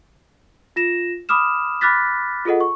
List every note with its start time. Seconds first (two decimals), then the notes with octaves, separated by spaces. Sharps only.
0.76 F4 A#6 E7
1.29 B5 D6 D#6 F6 E7
1.81 B5 D6 F6 F#6 A6 B6
2.45 F4 G#4 A4 D#5 F#5
2.60 C#6